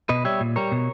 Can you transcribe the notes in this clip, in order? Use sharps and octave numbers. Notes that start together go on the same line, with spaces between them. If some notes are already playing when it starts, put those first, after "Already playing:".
B2 B4 D#5
G3 C#5 E5
A#2
G3 A#4 C#5
B2